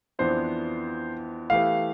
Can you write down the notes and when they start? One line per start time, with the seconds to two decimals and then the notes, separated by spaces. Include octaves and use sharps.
0.19 F2 E3 B3 D4 C5
1.50 E3 A3 E4 G4 B4 F5